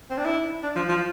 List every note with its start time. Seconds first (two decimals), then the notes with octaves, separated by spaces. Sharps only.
0.10 C4
0.17 D4
0.25 E4
0.63 D4
0.76 F3
0.89 F3